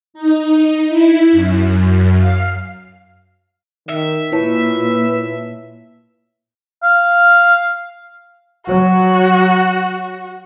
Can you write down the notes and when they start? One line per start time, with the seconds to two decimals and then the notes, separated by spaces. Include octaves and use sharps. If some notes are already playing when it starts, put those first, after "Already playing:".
0.14 D#4
0.88 E4
1.32 F#2
2.17 F5
3.89 D#3 E5
4.32 A#2 E4 B4 C#5 A5
6.83 F5
8.67 F#3 F#4